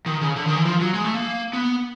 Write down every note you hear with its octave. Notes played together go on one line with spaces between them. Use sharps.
D#3
C#3
D3
D#3
E3
F3
F#3
G#3
A3
A#3
B3